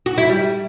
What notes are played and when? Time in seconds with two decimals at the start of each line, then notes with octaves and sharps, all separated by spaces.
0.06 F#4
0.18 E4
0.29 G3